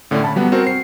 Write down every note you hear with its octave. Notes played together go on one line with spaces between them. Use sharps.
A2 D3 C#4 D4
A5 B5
F#3 G3 B3 F#5
C4 F#4 A#4 C5
C7